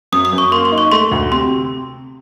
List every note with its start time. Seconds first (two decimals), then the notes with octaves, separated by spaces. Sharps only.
0.12 F#2 D#6
0.25 D#6
0.33 F#2
0.38 C#6
0.52 A#3 C6
0.65 C6
0.72 D#4
0.78 C#6
0.92 A3 C6
1.11 D2
1.31 C3 C6